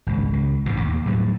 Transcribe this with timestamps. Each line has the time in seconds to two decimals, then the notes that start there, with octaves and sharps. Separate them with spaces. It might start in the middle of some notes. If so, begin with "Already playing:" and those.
0.07 G#1 C#2
0.33 C#2
0.66 A1 G#2 B2
0.80 D#2
1.06 A2 F#3 G3